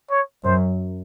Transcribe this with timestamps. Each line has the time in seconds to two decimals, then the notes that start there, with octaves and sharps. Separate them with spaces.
0.11 C#5
0.44 F#2 C5